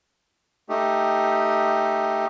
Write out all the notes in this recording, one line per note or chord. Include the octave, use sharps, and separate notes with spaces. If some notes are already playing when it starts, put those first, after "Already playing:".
A3 D#4 G4